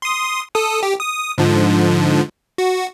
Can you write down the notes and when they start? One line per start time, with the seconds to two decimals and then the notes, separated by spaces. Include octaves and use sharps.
0.02 C6 D#6
0.55 A4 D#6
0.83 G4
1.00 D#6
1.38 G#2 D3 F3
2.58 F#4